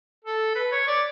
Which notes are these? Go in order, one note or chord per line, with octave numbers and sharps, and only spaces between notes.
A4
B4
C#5
D5